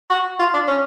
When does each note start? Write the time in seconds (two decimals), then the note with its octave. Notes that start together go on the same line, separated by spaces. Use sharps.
0.10 F#4
0.39 F4
0.54 D4
0.68 C#4